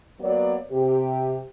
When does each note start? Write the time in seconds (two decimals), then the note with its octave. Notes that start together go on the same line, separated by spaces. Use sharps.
0.20 F#3 A#3 B3 C#5 D5
0.71 C3 G4